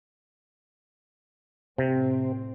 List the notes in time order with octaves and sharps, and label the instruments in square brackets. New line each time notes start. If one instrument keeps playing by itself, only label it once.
[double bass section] A2 C4 [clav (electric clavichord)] C3